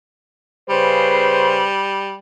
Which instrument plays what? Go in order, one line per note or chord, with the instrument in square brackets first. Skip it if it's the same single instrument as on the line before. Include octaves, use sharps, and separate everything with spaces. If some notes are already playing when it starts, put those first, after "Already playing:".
[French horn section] C#3 B4 C5 [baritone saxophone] G3